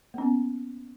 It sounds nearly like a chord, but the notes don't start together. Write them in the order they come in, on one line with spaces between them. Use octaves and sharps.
A#3 C#4 B3